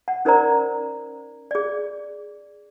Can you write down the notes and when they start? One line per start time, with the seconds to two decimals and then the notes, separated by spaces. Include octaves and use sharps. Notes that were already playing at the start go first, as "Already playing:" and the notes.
0.08 F#5
0.25 C#4 D#4 A#4 C5 D5 A#5
1.51 G#4 D5